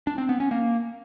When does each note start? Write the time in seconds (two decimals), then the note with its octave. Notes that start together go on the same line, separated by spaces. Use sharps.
0.07 D4
0.18 C4
0.29 B3
0.40 C#4
0.51 A#3